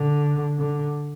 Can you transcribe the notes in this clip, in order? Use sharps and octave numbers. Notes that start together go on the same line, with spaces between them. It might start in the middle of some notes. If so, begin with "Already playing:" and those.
Already playing: D3
D3